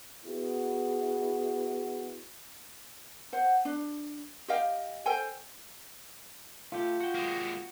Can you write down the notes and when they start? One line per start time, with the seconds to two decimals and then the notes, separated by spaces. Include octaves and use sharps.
0.25 B3 E4 F#4 G#4
3.33 C5 F#5
3.65 D4
4.48 G4 D#5 F5 G5
5.06 A4 C5 G5 G#5
6.72 A3 F4 G4
7.00 F#4 G5
7.15 G#3 A#3